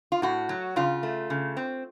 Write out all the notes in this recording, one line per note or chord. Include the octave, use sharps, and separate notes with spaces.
F4
A2 F#4
F#3
C#3 F4
A3
C#3
C4